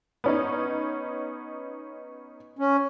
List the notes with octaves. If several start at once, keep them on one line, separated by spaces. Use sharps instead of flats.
B3 C#4 D#4
C#4